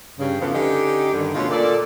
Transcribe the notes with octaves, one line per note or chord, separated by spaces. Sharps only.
G2 C#3
E2 C#3 E3 F3 B3 A4
D3 C#4 D#4 G4
G2 D3 D#3
B2 D3 G#3 A3 C#4 F4
A#2 A4 D5